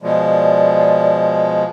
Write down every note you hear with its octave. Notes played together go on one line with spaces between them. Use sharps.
B2 F3 G#3 D5